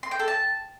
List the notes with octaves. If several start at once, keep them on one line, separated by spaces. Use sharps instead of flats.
C6
G5
A4
A5